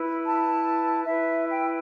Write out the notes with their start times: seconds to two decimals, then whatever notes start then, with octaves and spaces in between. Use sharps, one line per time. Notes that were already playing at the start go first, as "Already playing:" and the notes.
Already playing: E4 B4
0.25 A5
1.07 E4 B4 E5
1.49 G5